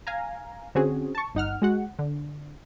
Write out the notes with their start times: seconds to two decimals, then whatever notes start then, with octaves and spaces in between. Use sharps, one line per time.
0.07 F5 G#5 A#5
0.75 D3 C4 C#4 F#4 G#4
1.15 A5 C#6
1.35 G1 D#4 F#5 F6
1.62 G#3 F#4 F#5
1.99 D3